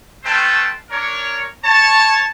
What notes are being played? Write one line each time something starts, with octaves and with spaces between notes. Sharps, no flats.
A3 C#4 B4 C5 G5 A5
D4 A#4 C#5
C#5 A5